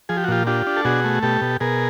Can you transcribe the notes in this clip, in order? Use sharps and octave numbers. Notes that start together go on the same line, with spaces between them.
F3 G#4
G4
F#4
A#2 F4 G4
D4 F4 G4
D4
A4
B2 F#4 G#4
A3
B2 G4 A4
B2
B2 G#4 A#4